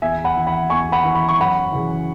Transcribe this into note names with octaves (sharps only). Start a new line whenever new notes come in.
E2 E5 G#5
F#5 B5
E3
F#5 B5
E2 G#5 C#6
F#5 B5
E3
B5
C#6
F#2 F#5 B5
C#3 E3